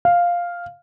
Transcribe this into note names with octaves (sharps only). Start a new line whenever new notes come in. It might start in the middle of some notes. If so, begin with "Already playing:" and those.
F5